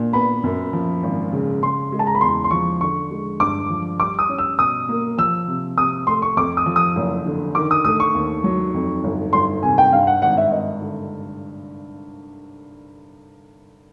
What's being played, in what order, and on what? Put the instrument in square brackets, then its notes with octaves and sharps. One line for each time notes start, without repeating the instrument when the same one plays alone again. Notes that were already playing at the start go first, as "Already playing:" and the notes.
Already playing: [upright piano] A#2 D4
[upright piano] B3 [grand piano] B5
[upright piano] F#2
F3
G#1
C#3
[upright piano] C#3 [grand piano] C6
[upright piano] G#3
[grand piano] A5
A#5
B5
[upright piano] E2 [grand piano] C6
[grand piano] C6
[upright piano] F3 [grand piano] C#6
[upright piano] D3 [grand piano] C#6
[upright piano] G#3
[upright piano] G2 [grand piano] D6
[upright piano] F3
[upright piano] G3 [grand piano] D6
[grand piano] D#6
[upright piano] C#4
[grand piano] E6
[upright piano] B2 [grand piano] D#6
[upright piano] A#3
[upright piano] F3 [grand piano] E6
[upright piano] C3
[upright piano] C3 [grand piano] D#6
[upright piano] A3 [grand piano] C6
[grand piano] C#6
[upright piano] F2 [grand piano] D6
[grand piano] D#6
[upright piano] F3
[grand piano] D#6
[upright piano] F#1
D3
[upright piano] D#3 [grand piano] D6
[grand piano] D#6
[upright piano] A3 [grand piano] D#6
[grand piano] C#6
[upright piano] D#2
F#3
F2
G1
[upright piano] G1 [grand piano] C6
[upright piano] C3 [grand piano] G#5
[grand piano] G5
[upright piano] G2 [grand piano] F5
[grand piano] F#5
[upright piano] G#1 [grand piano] F#5
[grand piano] E5
[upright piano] G#1 [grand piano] D#5
[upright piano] D3